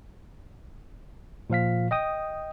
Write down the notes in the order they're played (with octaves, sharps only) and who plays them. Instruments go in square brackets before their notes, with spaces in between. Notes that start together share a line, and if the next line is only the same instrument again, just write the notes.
[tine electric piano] A#2 F3 F5 B6
D#5 G5 D#6